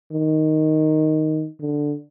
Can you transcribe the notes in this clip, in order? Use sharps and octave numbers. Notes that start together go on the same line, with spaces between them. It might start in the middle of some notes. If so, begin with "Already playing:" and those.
D#3
D3